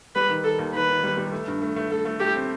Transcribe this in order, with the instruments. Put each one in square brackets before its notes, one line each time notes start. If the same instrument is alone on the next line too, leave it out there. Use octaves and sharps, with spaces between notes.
[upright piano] G3 [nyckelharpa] B4
[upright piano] D#3
[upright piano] D#3 [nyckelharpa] A4
[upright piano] D#2
[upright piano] D#3 [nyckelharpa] B4
[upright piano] D#3
G3
G3
A3
G2
A3
A3
[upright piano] A3 [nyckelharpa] A4
[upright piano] A3
[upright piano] A3 [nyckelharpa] G4
[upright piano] C4